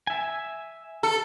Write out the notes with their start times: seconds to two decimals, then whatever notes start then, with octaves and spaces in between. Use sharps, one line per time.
0.07 E5 G#5
1.03 A4